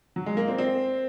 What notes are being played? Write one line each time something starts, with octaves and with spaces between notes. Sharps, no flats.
F#3
G#3
A#3
C4
C4